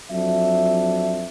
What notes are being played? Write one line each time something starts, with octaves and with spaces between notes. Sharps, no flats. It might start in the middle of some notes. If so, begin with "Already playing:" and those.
F2 F#3 D4 E5